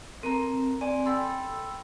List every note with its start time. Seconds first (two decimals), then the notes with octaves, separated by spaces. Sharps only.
0.23 C4 A4 A#4 A#5
0.81 C4 D5 G#5
1.06 A4 G5 B5 C6 E6